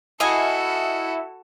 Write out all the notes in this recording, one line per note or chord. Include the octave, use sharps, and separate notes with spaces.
E4 F#4 A4 D#5 F5 G#5